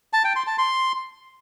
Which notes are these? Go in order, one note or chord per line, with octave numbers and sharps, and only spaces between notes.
A5
G5
C6
A5
C6